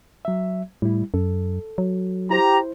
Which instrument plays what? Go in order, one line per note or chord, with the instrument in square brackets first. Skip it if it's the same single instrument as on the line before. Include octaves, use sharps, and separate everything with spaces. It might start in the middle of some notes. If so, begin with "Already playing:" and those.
[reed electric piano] F#3 E5
[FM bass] A2 [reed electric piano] G3 E4
[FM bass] F#2 [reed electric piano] A4
[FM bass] F#3
[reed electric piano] E4 C5 [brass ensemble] G4 A#5